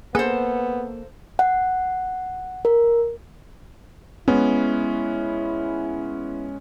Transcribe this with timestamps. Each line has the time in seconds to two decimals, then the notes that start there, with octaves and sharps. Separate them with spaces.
0.15 A#3 B3 G#4 A4 B4 C5 G#5
1.39 F#5
2.65 A#4
4.28 G#3 B3 C#4 E4